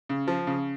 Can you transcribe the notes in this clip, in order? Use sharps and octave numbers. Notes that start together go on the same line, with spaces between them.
C#3
F3
C#3